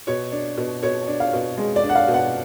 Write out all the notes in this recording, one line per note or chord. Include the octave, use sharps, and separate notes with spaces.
B2 C#5
D4
B2
B2 C#5
D4
F5
B2
G#3
D5
D4
F#5
F5
B2
F#5